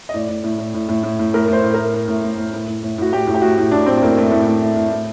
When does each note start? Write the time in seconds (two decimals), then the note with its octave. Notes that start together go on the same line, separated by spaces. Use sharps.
0.09 D#5
0.14 A2 D5
0.29 A2
0.44 A2
0.58 A2
0.74 A2
0.89 A2
1.03 A2
1.19 A2
1.34 A2 A#4
1.48 A2 C5
1.64 A2
1.74 A2 A#4
1.94 A2
2.08 A2
2.23 A2
2.37 A2
2.53 A2
2.67 A2
2.83 A2
2.98 A2 F#4
3.12 A2 G4
3.27 A2
3.34 G4
3.42 A2 F#4
3.58 A2
3.71 A2 D4
3.86 A2 C4
3.97 C4
4.02 A2 A#3
4.17 A2 A3
4.31 A2
4.47 A2
4.62 A2
4.76 A2
4.91 A2